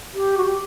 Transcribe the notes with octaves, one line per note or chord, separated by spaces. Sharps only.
G4
F#4
G4